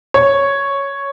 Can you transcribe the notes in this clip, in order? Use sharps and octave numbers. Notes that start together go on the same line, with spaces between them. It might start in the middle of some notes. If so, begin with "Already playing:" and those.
C#5